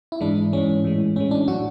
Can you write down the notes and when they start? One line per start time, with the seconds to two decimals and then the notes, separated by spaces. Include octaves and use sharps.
0.12 E4
0.20 G#2 E3 G#3 D4
0.52 G#2 E3 G#3 C#4
0.84 A2 E3 G#3
1.16 A2 E3 G#3 C#4
1.31 D4
1.48 A2 F#3 F#4